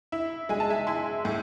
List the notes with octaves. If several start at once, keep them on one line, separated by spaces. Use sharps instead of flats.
E4
G#3 G#5
A5
E5 G#5
E4 G#5 C6
A2